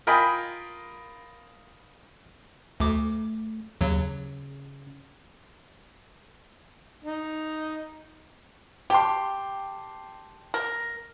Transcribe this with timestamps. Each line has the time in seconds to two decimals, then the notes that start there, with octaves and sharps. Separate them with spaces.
0.07 F4 A#4 D#5 G5 G#5 B5
2.80 D2 A3 D6
3.81 D#2 C#3 F#3
7.05 D#4
8.90 G4 G5 A5 C6
10.54 A#4